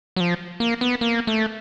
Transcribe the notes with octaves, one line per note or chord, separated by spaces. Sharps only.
F#3
F3
A#3
B3
A#3
A3